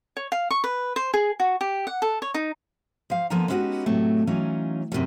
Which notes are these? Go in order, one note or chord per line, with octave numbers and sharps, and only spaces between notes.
C#5
F5
C#6
B4
C5
G#4
F#4
G4
F#5
A4
C#5
D#4
F3 F5
D3 F3 A#3 B3 G#5 A#5
G#3 B3 C#4 D#4 F#4 G4
A2 C3 F#3 A3
E3 F#3 C#4 D#4 F4
F#2 C3 D#3 G3